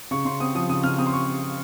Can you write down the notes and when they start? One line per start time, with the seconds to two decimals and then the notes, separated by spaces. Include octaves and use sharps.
0.11 C#3 C#6
0.25 C#3 C6
0.40 C4 D#6
0.55 F3 D#6
0.69 C#3 D#6
0.84 C#3 F6
0.98 C4 D#6
1.07 C6
1.13 C#6